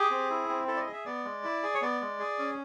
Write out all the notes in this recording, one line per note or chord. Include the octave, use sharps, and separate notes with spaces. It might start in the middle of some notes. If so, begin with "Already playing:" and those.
Already playing: G4 G#4
C4
E4
C4
E4 A4
D5
D#5
G#4
E5
B3 D5
G#3
E4
G#4
C#5
B3 D5
G#3
G#4
C#4